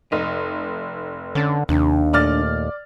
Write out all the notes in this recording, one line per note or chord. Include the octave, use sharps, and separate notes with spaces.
F1 D#4
D3 C#4 A5
D#2 C3 D4
A#2 A3 D5 D#5 F6 A6